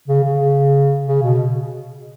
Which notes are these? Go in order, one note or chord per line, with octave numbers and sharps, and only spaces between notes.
C#3
C#3
C#3
B2